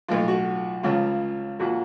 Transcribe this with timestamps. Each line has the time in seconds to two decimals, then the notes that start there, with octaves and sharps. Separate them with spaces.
0.08 B1 A2 F3 F4
0.28 F#4
0.83 C#2 C#3 F3 F4
1.59 A#1 A#2 F3 F#4